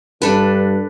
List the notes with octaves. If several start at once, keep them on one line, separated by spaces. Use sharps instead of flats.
G2 D4 A4 B4